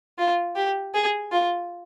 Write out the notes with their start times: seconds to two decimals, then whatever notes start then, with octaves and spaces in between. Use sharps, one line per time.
0.18 F4
0.56 G4
0.94 G#4
1.32 F4